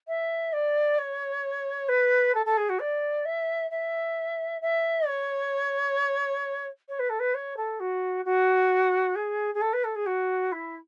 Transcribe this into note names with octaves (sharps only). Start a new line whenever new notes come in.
E5
D5
C#5
B4
A4
A4
G#4
F#4
D5
E5
E5
E5
C#5
C#5
B4
A4
B4
C#5
A4
F#4
F#4
G#4
G#4
A4
B4
A4
G#4
F#4
E4